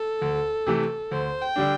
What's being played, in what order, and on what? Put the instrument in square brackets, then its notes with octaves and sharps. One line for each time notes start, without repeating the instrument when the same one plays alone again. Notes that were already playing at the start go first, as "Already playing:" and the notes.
Already playing: [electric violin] A4
[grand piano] D2
C3 E3 A3
[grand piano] D2 [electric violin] C5
[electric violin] G5
[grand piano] D3 G3 D4